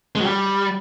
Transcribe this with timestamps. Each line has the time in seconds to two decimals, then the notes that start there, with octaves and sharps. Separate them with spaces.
0.15 G#3
0.21 F#3
0.26 G3